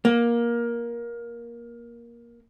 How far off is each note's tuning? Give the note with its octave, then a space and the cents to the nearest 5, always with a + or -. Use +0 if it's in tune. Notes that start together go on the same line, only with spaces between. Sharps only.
A#3 +15